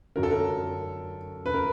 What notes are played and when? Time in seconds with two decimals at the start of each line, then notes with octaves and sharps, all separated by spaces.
0.16 F#2 D3 F#3 A#4
0.23 A4
0.31 A#4
1.46 B4
1.54 A#4